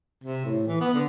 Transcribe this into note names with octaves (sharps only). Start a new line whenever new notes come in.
C3
A2
E3
B3
D3